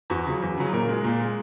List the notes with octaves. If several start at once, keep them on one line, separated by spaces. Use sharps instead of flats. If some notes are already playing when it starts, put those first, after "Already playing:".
E2 F#4
C#3 F#3
E2
C#3 F#3
A#2 A#4
G#3
A#2
G#3